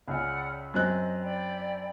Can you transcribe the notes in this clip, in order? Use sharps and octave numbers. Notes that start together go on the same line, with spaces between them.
C#2 C#3 D5 F#5 F6
F#2 C4 D#5 F#6
D5 G5 B5